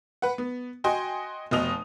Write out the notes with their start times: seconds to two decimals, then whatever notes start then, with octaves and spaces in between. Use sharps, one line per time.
0.22 B4 F#5
0.38 B3
0.84 F#4 D#5 G5 G#5 C6
1.51 F1 B2 D#5 D#6 F7